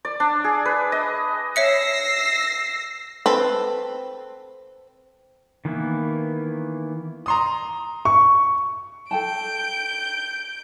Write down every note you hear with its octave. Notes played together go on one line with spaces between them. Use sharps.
D5
D4
G#4
B4
D#5
C#5 E5 E6 A#6 C7 C#7
C4 A4 B4
D#3 E3 A#3 B3 E4
A#5 C6 D#6
C#6
A4 G5 A5 G6 D7